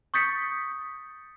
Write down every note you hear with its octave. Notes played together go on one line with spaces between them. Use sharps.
C#6 D#6 G6 A6 B6 C#7